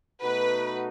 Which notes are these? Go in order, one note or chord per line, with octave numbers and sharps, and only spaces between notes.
B2 A3 D#4 F#4 B4